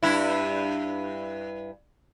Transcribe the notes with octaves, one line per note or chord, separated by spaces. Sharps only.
G2 E4